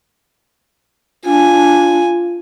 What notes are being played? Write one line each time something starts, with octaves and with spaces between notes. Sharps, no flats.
D4 F4 G#5